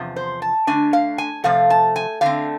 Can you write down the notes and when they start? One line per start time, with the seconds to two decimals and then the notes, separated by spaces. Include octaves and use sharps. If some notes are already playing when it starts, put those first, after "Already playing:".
Already playing: E2 C3 F3
0.16 C5
0.42 A5
0.67 D3 A3 D4 G#5
0.93 F5
1.18 G#5
1.44 C3 F3 A3 F5
1.70 A5
1.96 G#5
2.21 D3 A3 C4 F5